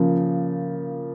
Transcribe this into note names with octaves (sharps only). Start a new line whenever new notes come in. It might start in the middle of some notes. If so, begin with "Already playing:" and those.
Already playing: C#3 F3 A#3